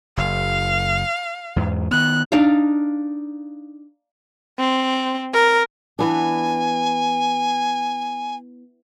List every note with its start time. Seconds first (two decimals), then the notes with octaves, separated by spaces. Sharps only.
0.17 F#1 F5
1.56 E2 G#2
1.91 D#3 B3 F#6
2.32 D4 D#4 F5
4.59 C4
5.34 A#4
5.99 E3 B3 D4 G#5